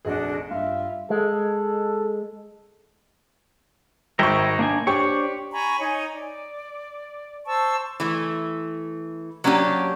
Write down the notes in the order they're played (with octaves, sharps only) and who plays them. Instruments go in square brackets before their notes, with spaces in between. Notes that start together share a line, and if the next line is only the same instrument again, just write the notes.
[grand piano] F1 A#1 G#4 [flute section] D4 F#4 D#5
[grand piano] G2 [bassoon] F4 [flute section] E5
[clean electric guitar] G#3 [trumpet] A4
[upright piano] G#1 C#6 [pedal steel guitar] A#4 E5 G5
[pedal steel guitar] A#3 D4 G#5
[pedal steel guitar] D4 C5 C#5 [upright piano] G4 C#6
[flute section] G#5 A#5 B5 C#6
D#4 C#5 G#5
D5
C5 A5 C#6 E6
[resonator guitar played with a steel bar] E3 A3
F#3 A#3 C#4 D4 G4